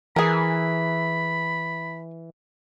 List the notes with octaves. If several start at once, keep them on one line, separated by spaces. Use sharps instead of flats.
E3 G#4 A#4 B5